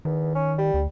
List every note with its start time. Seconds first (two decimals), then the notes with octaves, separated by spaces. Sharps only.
0.05 E2 D#3
0.35 C#4
0.58 G3
0.74 D2